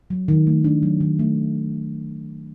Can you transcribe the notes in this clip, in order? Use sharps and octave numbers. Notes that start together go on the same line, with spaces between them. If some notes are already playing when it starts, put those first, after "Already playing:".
F#3
D#3
A3
D4
F#3
D#3
A3